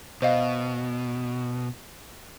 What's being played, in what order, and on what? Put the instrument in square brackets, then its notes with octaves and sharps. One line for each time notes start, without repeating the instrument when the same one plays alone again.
[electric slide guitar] B2 [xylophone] C5 D#5 F5